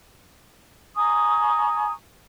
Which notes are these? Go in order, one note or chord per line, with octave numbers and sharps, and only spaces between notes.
G#5 A#5 C#6 D#6